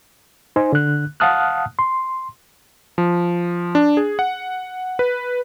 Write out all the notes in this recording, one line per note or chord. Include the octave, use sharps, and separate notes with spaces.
D#4 C5 G#5
D3 F#6
F5 F#5 A5 D#6 F6 F#6
C6
F3
D4
G#4
F#5
B4